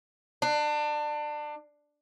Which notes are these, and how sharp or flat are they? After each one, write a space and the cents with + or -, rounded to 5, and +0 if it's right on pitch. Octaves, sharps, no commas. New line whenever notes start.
D4 +25